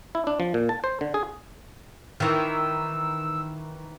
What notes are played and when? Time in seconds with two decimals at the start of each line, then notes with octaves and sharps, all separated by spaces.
0.15 E4
0.27 D4
0.40 F3
0.54 A#2
0.69 A5
0.84 C5
1.01 D3
1.14 G#4
2.20 D#3 E3 E6